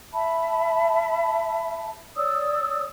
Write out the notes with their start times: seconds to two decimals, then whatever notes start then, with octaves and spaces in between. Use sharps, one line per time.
0.13 E5 A5 B5
2.16 C#5 D5 D#6 E6